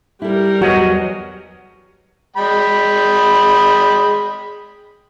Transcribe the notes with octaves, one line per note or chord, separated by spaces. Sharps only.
G3 E4 A4 A#4
E2 F#3 F#4 C#5 D#5 F#5
G#3 G5 B5